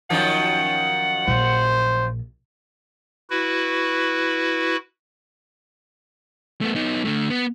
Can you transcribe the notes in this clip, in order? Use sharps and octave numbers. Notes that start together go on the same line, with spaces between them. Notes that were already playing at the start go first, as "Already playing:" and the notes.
F#2 D#3 F3 F#5
A#1 C5
E4 F#4 B4
A3 B3
B3 D#4
D3 A3
B3